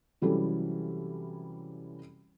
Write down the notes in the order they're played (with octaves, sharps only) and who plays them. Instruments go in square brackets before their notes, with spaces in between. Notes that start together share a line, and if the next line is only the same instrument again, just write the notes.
[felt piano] C3 E3 F#3 G3 C#4 A4